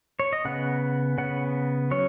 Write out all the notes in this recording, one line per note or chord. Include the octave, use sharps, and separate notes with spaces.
C#5
D#5
C#3 B3 F#5
C#3 B3 F#5
F#3 C#4 C#5